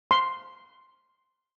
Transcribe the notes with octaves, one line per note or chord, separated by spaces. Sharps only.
C6